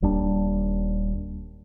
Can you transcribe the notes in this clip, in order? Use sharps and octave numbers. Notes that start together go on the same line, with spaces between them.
D#1 D#2 G3 D4